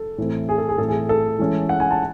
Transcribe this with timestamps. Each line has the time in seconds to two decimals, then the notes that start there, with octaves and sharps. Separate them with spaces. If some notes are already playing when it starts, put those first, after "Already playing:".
Already playing: A4
0.18 A2 E3 A3 C4
0.49 G#4
0.58 A4
0.69 G#4
0.78 A2 E3 C4 A4
0.88 G#4
1.09 A4
1.39 E3 G#3 C#4
1.69 F#5
1.80 G#5
1.91 A5